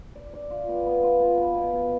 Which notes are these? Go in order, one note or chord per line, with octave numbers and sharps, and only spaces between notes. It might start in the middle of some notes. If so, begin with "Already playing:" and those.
D5
D5
F4
B3
B3
F4
B3
B4
B2
B2